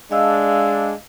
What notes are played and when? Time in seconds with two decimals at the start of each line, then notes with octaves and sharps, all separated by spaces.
0.11 G#3 D4 D#5 F5 E6